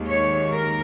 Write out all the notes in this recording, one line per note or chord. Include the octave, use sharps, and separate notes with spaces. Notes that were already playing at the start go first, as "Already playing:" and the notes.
Already playing: D#2 D#3 G#3
C#5
A#4